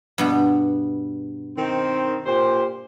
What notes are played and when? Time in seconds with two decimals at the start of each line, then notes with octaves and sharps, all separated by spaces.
0.18 G2 B2 B3
1.58 D#3 C4
2.26 A#2 G4 C5